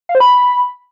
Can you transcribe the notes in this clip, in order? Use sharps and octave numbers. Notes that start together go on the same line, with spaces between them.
F5
C5
B5